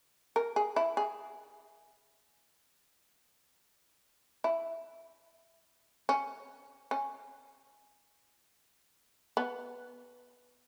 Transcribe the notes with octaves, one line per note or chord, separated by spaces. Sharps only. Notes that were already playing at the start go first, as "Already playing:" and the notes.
A#4
G#4
E4
G#4
E4
C#4
C#4
B3